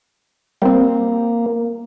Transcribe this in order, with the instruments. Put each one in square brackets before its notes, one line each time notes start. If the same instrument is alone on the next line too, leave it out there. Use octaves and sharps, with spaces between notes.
[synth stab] G3 C4 [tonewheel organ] A#3